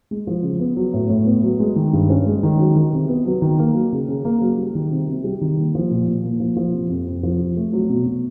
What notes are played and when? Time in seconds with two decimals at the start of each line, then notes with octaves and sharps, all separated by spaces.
0.11 G#3
0.27 F3
0.43 C#3
0.60 B3
0.77 F#3
0.93 A2
1.09 A2
1.26 B3
1.44 F#3
1.60 G#3
1.76 D#3
1.93 G2
2.10 C#4
2.27 G#3
2.43 D#3
2.60 F#3
2.76 D#3
2.93 C3
3.08 B3
3.26 F#3
3.42 D#3
3.59 A#3
3.75 F#3
3.92 C#3
4.08 C#3
4.25 A#3
4.41 F#3
4.58 G3
4.75 D#3
4.91 C3
5.08 C3
5.24 G3
5.41 D#3
5.58 A#3
5.75 F3
5.91 A#2
6.08 A#2
6.24 A#3
6.40 F3
6.57 F3
6.73 C3
6.90 F2
7.07 F2
7.23 F3
7.40 C3
7.57 A3
7.73 F#3
7.89 B2
8.06 B2